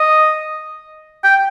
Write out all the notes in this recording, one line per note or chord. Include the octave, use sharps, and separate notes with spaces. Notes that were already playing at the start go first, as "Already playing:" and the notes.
Already playing: D#5
G5